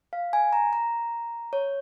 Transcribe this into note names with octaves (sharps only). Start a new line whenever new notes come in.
F5
G#5
A#5
A#5
C#5